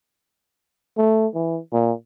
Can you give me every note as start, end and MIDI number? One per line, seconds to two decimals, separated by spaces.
0.97 1.27 57
1.34 1.59 52
1.73 1.92 46